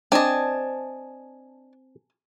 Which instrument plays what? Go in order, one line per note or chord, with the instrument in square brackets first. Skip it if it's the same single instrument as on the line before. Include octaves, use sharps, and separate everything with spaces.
[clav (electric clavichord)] C4 [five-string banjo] D4 D#5 [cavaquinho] G#5 A5